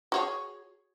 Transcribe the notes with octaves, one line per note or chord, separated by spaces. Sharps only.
F#4 G#4 C#5